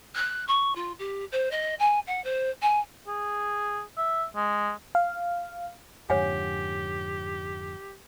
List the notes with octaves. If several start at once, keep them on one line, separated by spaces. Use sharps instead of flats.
F#6
C#6
F4
G4
C5
D#5
G#5
F#5
C5
G#5
G#4
E5
G#3
F5
F2 G#2 D3 G4 C#5 F#5 G#5